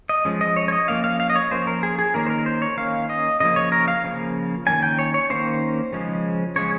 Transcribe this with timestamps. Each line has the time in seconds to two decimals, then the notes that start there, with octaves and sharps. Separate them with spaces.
0.09 D#5
0.25 F3 G#3 C#4
0.41 D#5
0.57 C#5
0.68 C#5
0.72 D#5
0.88 F3 A#3 C#4 F5
1.04 F5
1.20 F5
1.30 D#5
1.36 C#5
1.51 F3 A#3 C#4 C5
1.67 A#4
1.83 G#4
1.99 G#4
2.14 D#3 A#3 C#4 A#4
2.26 C5
2.30 A#4
2.46 C5
2.62 C#5
2.77 D#3 A#3 C#4 F5
3.10 D#5
3.40 C#3 F3 A#3 D#5
3.56 C#5
3.72 A#4
3.88 F5
4.04 C#3 F3 A#3
4.66 D#3 G3 A#3 C#4 G#5
4.83 G5
4.99 C#5
5.14 C#5
5.30 D#3 G3 A#3 C#4 C5
5.93 C#3 F3 G#3 C#4
6.56 C#3 F3 G#3 C#4 C#5